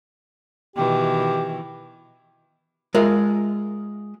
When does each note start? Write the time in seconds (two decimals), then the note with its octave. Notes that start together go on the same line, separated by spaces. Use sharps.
0.76 B2 D#3 E3 G4
2.94 G#3 F4 A#4 E5